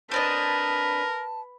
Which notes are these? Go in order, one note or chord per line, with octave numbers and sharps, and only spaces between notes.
C4 D4 A#4 B4 D#5 A5